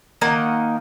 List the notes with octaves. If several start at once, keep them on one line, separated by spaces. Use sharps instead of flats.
D#3 A#3 D#5 F#5